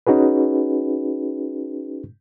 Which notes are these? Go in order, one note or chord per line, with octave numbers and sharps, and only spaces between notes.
C#4 D#4 F#4 G#4 B4